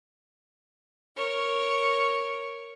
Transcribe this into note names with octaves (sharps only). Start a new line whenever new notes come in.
A#4 C#5